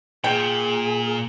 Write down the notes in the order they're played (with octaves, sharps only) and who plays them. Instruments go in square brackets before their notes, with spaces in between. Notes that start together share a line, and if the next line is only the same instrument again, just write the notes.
[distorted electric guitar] A#2 [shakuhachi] G#4 [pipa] G5